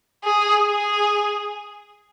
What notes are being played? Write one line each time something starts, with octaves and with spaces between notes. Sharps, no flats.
G#4
G#4